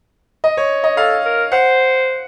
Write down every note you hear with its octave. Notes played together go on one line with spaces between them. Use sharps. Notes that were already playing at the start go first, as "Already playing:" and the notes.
D#5
C#5
D#5
A4 F5
A#4
C5 F#5